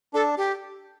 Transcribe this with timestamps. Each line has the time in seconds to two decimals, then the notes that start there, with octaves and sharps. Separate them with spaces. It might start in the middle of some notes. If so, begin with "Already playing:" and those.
0.14 D4 A4
0.37 G4